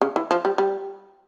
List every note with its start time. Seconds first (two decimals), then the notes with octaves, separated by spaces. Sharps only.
0.01 C#3
0.16 E3
0.31 F3
0.45 G3
0.58 G3